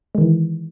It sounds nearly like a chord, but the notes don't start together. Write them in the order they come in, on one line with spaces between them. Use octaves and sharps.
G#3 D#3 E3